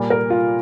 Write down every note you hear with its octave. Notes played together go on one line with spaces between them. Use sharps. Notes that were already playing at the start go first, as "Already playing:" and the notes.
Already playing: A#2 G3 A#3
A#4
F4